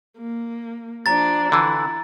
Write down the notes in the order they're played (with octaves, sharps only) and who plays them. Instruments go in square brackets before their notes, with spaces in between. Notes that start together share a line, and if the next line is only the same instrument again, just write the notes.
[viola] A#3
[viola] F3 D4 [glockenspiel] A#5 A6
[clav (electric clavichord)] D3 E3 [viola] E4